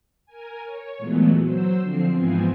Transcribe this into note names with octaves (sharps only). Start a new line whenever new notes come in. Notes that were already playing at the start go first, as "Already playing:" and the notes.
A#4 G#5
C#5
A#2 E3 F#3 G#3 A3 B3
F#3 C5 E6
D3 F3 C4 C7
G#2 E3 F3 B3 C4 G#5